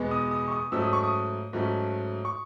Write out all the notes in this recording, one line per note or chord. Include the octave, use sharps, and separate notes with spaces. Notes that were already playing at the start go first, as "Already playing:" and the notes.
Already playing: E2 B2 G#3 B3
D#6
D#6
C#6
D#6
G#2 F#3 A3 C#4 E6
D#6
C#6
D#6
G#2 F#3 A3 C#4
C#6